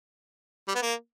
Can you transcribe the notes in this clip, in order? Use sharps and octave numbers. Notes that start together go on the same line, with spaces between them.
G3
B3
A#3